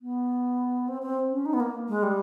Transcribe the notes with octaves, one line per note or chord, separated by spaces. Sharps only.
B3
C4
C4
C#4
D#4
B3
A#3
G#3
G3